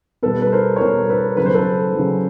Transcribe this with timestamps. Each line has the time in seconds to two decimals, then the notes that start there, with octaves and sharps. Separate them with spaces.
0.23 B2 G3 A4 B4
0.42 B4
0.52 A#4 C5
0.76 C#5
0.81 B2 G3 A#4 C5
1.09 A4 B4
1.37 C#3 F#3 B4
1.46 C5
1.54 A4 B4
1.95 C#3 F#3